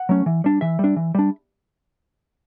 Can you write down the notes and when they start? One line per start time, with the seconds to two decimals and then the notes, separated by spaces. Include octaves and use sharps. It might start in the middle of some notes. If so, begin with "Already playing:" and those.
Already playing: F#5
0.09 F#3 A3 C#4
0.26 E3
0.44 G3 D4
0.61 E3 E5
0.79 G3 D4
0.96 E3
1.15 G3 D4